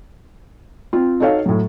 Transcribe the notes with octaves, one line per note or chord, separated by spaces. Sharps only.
C4 F4
D#4 F#4 A4 C#5 F5
A2 F#3